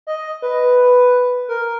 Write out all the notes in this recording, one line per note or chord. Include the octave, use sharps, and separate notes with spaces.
D#5
B4
A#4